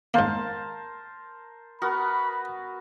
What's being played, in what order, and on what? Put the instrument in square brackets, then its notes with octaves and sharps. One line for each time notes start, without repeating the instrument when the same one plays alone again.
[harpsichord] G#2 A#3 [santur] A#4 C5 A5
[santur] B3 F#4 A#4 [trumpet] B5